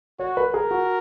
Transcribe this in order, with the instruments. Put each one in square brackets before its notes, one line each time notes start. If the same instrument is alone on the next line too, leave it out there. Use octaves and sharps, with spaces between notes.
[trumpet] F#4 [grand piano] C#5
[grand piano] B4
[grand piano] G#4 [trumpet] A#4
[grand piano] F#4